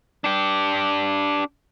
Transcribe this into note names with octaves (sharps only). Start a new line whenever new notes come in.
D4 G4